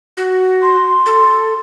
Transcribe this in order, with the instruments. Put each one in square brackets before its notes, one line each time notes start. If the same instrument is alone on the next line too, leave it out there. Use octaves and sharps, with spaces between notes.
[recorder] F#4
[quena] C6
[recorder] A4